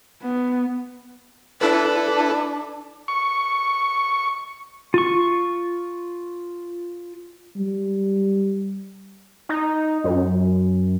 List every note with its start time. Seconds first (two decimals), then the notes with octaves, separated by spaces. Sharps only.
0.22 B3
1.61 D4 E4 A4 B4
3.08 C#6
4.94 F4 C#6
7.56 G3
9.49 D#4
10.04 F#2